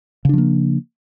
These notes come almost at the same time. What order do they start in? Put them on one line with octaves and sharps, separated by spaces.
C#3 D4 F3 A#3